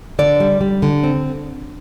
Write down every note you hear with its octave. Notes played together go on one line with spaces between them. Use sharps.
D3 D5
G3
G3
D3
C4